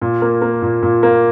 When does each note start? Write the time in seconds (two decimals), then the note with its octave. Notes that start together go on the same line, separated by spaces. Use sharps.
0.01 A#2
0.22 A#3
0.42 A#3
0.62 A#2
0.83 A#2
1.03 A#3